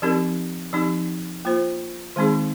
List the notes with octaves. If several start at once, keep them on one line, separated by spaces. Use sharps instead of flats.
F3 C4 D#4 G4 A#4
F3 C4 D#4 G4
A#3 F4 C5
D#3 G#3 C4 D#4 G#4